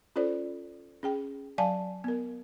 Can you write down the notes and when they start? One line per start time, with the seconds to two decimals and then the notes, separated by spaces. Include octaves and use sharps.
0.16 C#4 F4 A4 C5 D5
1.03 C#4 G#4 G5
1.58 F#3 D5 F5 G#5 A5
2.04 B3 A#4